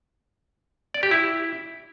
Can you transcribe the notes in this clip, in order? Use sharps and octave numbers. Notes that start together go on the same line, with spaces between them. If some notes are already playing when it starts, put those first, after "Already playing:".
D5
G4
E4